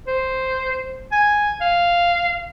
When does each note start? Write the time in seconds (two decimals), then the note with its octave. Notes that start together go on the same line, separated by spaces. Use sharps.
0.07 C5
1.12 G#5
1.61 F5